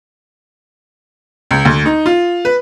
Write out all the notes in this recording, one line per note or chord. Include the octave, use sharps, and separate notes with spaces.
C#2
D2
D#4
F4
B4